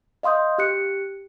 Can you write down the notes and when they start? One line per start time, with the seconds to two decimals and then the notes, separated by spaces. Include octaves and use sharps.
0.23 D#5 F5 C6 D#6 G6
0.58 G4 F#6 C#7